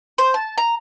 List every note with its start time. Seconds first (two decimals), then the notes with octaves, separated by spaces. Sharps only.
0.18 C5
0.34 A5
0.58 A#5